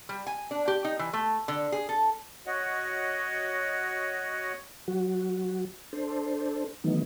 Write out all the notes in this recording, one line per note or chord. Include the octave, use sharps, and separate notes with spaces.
G3
G#5
D4
G4
D#4
E3
A3
D3
G#4
A4
F#4 C#5 D#5 F#5
F#3 F#4
D4 A4 C5
D#3 E3 F#3 A3 B3 D#4